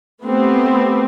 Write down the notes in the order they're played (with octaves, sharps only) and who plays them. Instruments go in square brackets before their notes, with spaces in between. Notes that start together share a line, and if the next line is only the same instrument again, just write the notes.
[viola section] A3 B3 C4 G4